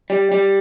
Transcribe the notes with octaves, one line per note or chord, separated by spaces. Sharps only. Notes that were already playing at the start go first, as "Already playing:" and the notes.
G3
G3